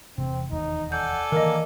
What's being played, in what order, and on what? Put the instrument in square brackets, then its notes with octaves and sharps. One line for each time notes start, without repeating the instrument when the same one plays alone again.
[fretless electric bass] E1 C3 [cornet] C4
[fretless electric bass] E1 D#2 [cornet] D#4
[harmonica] A4 D5 G#5 [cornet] F#5 [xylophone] G6
[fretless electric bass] D#3 E3 [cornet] A#3 [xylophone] A#4 D#5